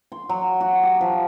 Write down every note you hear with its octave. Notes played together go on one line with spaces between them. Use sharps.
C6
F#3
F#4
G4
F3